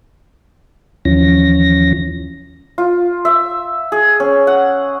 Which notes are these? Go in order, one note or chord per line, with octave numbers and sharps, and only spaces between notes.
D#2 E3 F3 C#4 A#6
F4
E5
G#4
C#4
F#5